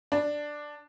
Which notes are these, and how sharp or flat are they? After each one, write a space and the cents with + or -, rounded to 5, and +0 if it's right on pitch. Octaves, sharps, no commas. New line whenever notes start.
D4 +5